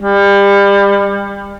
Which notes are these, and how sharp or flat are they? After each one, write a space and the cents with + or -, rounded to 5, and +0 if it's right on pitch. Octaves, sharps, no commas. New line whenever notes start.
G3 +30